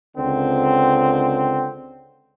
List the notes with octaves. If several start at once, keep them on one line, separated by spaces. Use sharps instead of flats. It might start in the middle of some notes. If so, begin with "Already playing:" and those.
C#2 D3 C4